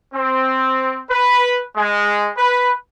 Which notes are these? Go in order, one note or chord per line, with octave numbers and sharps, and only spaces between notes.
C4
B4
G#3
B4